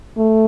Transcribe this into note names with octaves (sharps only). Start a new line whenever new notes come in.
A3